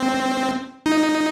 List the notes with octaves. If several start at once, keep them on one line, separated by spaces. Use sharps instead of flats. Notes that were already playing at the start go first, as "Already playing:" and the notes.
Already playing: C4
D#4